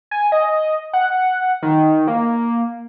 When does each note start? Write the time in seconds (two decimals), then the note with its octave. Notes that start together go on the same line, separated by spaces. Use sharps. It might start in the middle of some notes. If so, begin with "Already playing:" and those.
0.11 G#5
0.32 D#5
0.93 F#5
1.63 D#3
2.07 A#3